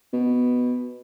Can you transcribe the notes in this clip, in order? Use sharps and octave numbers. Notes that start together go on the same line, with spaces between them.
B2